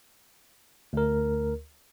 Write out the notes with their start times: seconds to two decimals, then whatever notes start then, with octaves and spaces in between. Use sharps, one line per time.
0.93 D2 A#4